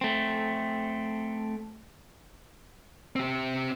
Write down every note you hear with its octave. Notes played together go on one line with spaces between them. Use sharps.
A3 C4
C4 G4